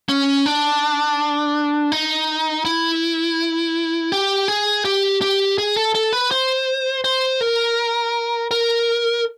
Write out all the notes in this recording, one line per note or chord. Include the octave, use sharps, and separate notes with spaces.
C#4
D4
D#4
E4
G4
G#4
G4
G4
G#4
A4
A4
B4
C5
C5
A#4
A#4